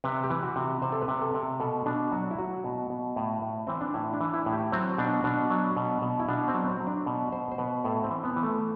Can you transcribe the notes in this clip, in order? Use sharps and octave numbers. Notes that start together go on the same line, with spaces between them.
C3 B4
G4
E3
F#4
C3
C3 C5
A4
B4
C3
A4
C3
B2 A4
B2 D4
F#3 F#4
E4
F#3 F#4
B2
B2
A2
A2
E3 C4
D4
A2 E4
D4
E3
E4
A2
G4
F#3 C4
B2 D4
B2 D4
F#3
B2
B2
E4
B2 D4
C4
F#3
C4
F#3
D4
B2
B2 C5
C5
B2 B4
A2 A4
C4
E3
B3
E3
A3